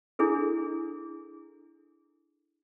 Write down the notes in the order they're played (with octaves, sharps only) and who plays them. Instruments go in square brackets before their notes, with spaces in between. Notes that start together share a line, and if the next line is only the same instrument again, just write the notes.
[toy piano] D4 E4 G#4 A4